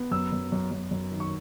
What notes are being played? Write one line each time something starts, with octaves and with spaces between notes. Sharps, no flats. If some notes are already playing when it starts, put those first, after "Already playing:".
Already playing: B3
F#2 E6
F#2
F#2
F#2
F#2
D#3
C#6